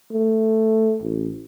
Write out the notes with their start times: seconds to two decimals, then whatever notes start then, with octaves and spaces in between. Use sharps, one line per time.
0.12 A3
1.02 A1